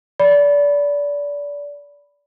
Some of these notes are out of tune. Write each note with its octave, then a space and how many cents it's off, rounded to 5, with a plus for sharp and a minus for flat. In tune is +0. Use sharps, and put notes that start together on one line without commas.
D5 -25 B5 +0